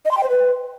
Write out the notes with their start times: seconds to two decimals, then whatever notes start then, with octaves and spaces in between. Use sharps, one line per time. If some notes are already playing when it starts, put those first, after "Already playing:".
0.05 D#5
0.11 C6
0.17 G5
0.23 C5
0.29 B4